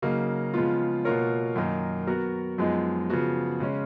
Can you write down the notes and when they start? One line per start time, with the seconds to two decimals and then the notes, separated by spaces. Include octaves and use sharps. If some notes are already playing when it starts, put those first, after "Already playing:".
0.02 C#3 F#3 A#3 D#4
0.54 C#3 F3 G#3 B3 F4
1.05 B2 A#3 F4 A#4 C#5
1.55 F#2 D#3 A#3 D#4 A#4
2.07 F#3 B3 F#4 A#4
2.58 F#2 F3 G#3 B3 D#4
3.10 C#3 F3 B3 F#4
3.60 C#3 G#3 C#4